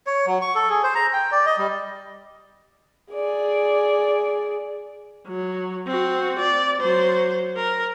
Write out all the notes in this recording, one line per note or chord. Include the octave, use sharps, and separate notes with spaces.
C#5
F#3
C#6
A4
G#4
C5
A#5
G5
D5
D#5
G3
G#4 D5
F#3
C4 F#4
D5
F#3 C5
A#4